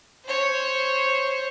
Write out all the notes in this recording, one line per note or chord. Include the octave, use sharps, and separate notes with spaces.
C5 C#5